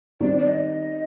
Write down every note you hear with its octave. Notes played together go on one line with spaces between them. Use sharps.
D#3 G3 C4 D5
D5
D#5